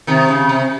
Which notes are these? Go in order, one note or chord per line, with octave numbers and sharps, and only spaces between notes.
C3 D#3
C#3
C3